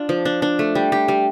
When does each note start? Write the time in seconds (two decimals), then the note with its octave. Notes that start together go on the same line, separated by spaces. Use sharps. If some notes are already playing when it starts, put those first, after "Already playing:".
Already playing: D4 F4
0.09 F3
0.25 D4
0.42 D4
0.59 A3
0.75 G3
0.92 G4
1.08 G3